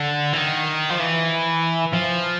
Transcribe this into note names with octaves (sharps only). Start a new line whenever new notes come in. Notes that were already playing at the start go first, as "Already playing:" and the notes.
Already playing: D3
E3
D#3
F3
E3
F3